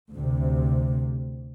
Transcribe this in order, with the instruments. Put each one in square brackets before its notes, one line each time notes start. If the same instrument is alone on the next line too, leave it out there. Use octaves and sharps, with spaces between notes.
[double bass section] D2 C3